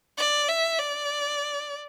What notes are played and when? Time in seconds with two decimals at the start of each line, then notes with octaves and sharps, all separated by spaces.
0.18 D5
0.48 E5
0.79 D5